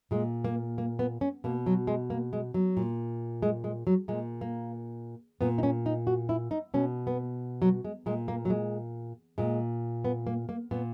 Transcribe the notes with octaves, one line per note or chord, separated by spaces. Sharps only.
A#2 G#3
A#3
A#3
B3
C#4
B2 A#3
F#3
G#3
A#3
G#3
F#3
A#2
G#3
G#3
F#3
A#2 G#3
A#3
A#2 B3
D#4
C#4
D#4
F#4
E4
D#4
B2 C#4
B3
F#3
G#3
A#2 G#3
A#3
F#3
G#3
A#2 G#3
B3
A#3
A#3
A#2 B3